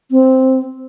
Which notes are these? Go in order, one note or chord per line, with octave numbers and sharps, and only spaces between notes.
C4